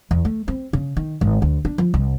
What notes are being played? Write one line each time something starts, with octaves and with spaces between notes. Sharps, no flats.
E2
A3
C4
C#3
D#3
G#1
D2
D4
F3
C2